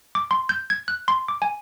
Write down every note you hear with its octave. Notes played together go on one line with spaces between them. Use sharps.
D6
C6
G6
G#6
F#6
C6
D6
G#5